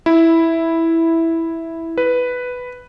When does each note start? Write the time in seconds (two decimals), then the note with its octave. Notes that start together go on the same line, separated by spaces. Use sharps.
0.06 E4
1.98 B4